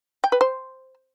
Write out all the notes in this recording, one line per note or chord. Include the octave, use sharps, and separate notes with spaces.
G5
B4
C5